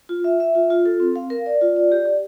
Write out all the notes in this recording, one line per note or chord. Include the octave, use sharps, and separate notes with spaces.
F4
E5
E5
F4
F4
A4
C4
F5
A#4
D5
F4
D5
G4
G4